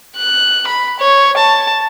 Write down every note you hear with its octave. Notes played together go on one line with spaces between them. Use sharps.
F#6
B5
C#5
A5